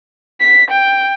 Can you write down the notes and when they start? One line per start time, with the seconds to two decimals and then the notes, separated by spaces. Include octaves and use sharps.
0.40 B6
0.71 G5